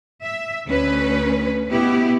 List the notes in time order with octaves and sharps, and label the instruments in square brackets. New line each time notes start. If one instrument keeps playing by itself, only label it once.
[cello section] E5
D2 C#4 B4
B2 B3 E4 G4